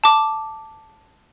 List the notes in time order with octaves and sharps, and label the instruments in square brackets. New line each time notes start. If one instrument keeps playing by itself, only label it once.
[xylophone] A5 D6